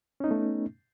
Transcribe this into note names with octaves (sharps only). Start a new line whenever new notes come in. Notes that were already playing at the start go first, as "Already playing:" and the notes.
A3 B3 C#4 D#4